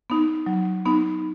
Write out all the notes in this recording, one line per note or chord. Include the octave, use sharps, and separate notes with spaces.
B3 D#4
F#3
B3 D#4